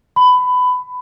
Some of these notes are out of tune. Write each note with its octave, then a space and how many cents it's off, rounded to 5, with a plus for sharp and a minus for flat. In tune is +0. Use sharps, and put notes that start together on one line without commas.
B5 +20